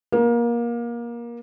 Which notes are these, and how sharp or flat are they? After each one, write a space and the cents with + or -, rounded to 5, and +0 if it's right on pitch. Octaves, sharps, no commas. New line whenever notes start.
A#3 +25